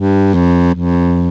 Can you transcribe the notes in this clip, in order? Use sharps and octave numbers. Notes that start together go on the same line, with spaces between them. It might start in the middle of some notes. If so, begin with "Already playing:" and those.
Already playing: G2
F2
F2